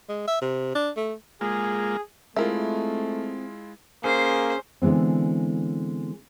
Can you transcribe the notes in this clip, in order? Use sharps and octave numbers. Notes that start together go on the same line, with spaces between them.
G#3
E5
C3
D4
A3
G#3 A#3 F4 G#4
G#3 A3 C4 E4 F4 A#4 E5
A#3 C#4 G#4 C5
D3 E3 G#3 B3 C4